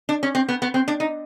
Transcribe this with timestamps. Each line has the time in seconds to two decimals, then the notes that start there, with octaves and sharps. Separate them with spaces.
0.09 D4
0.23 C#4
0.35 C4
0.49 B3
0.62 B3
0.74 C4
0.88 D4
1.00 D#4